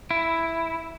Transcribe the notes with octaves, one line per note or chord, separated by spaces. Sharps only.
E4